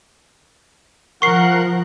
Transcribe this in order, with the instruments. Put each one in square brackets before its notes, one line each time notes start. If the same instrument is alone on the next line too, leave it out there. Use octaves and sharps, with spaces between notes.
[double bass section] F3 [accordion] A#4 F#5 F#6 [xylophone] C#6 C7